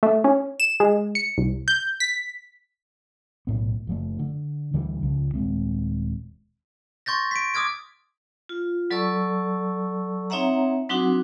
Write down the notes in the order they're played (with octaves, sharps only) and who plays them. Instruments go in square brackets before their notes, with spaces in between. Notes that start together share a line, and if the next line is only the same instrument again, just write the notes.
[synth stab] A3
C#4
E7
G#3
C#7
C2
G6
B6
[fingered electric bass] B1 A2 B3
F#1 F3 A3
D3
D2 D3 E3 G3
C#2 C#3 F3
D#1 F#2 G#3 C4
[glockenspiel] C6 C#6 G6 A6 A#6
B6 D7
D6 D#6 F6 G#6 D7
[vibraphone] F4
F#3 A4 D5 A5 C#6 E6
C4 D#4 C#5 E5 F#5 A#5
F#3 C4 D4 D#4 F#4 F#5